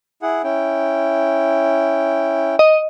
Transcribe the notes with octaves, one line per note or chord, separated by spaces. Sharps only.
E4 G#4 F#5
C#4 E4 G5
D#5